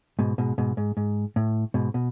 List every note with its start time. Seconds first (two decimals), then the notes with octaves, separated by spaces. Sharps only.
0.19 G#2 B2
0.38 G#2 B2
0.58 G#2 B2
0.77 G#2
0.97 G#2
1.36 A2
1.74 G#2 B2
1.94 B2